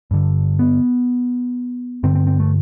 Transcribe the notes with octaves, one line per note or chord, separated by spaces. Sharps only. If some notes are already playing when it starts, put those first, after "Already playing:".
G2 D3
B3
G2 D3 C4
C4
C4
A3